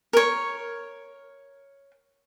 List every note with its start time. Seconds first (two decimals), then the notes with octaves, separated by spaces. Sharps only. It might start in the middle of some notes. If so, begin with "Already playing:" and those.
0.13 A#4 C#5